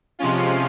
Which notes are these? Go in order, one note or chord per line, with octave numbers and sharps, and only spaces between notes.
C3 F3 G#3 C#4 F4